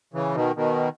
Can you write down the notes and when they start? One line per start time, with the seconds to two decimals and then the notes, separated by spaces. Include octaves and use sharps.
0.13 C#3 E3
0.35 B2 D#3
0.56 B2 D#3